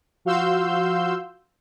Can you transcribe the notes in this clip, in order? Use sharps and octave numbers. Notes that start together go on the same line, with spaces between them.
F3 F#4 F5 C6 E6 G6